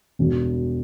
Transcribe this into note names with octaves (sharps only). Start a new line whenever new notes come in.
E1